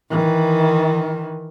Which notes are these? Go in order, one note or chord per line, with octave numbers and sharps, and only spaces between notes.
D#3 E3